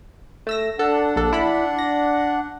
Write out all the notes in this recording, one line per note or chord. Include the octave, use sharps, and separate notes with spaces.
A3 E6 A#6
D4 A4 F#5
A#1 A4
E4 B5
A#6